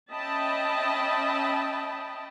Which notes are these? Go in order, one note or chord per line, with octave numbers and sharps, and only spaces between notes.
C#4 D#5 E5 G5 A5 B5